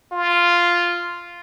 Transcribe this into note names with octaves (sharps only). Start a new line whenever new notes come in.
F4